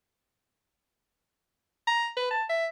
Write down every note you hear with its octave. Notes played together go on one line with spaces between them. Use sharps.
A#5
B4
A5
E5